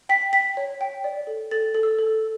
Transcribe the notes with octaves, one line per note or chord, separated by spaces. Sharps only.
G5 B6
G5 B6
C#5
G5
D5
A4
A4 A6
A4
E6
A4